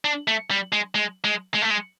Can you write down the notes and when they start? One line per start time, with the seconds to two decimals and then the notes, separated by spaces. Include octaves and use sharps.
0.05 D4
0.28 A3
0.51 G3
0.72 G#3
0.95 G#3
1.24 G#3
1.54 G#3
1.62 A3
1.70 G#3